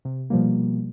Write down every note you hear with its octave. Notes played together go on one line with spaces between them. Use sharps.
C3
B2 F3 G3 A#3